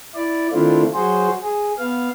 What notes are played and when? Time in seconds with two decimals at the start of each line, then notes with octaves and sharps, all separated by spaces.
0.14 E4 D5
0.52 D#3 A3 C4 D4 E4 F4
0.94 F#3 F#4 G#4 C5
1.42 G#4
1.78 B3 F5